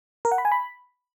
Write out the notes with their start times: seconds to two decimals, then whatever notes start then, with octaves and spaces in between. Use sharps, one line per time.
0.25 A#4
0.32 F#5
0.38 B5
0.45 G#5
0.52 B5